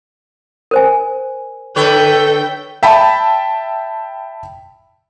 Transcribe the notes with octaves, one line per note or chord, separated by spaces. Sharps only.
A#4 C5 G#5
D3 A4 B4 C#5 G5
E5 G5 A5 B5